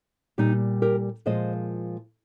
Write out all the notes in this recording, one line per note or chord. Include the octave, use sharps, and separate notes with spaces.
A#2 G3 D#4 G4
G4 A#4
A#2 F3 G#3 C5 D#5